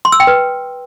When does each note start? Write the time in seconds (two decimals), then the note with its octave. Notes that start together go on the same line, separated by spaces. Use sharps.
0.05 C6
0.12 E6
0.20 G5
0.27 B4